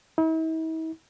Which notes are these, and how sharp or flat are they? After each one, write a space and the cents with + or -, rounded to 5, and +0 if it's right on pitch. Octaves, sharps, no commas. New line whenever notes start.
E4 -45